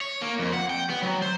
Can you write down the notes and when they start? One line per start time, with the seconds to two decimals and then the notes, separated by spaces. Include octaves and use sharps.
0.01 C#5
0.22 A#3
0.39 F2
0.53 F#5
0.70 G5
0.90 B3
1.02 F#3
1.22 C5